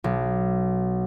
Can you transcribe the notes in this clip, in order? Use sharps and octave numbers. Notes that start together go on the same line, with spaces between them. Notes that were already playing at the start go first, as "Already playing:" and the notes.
B1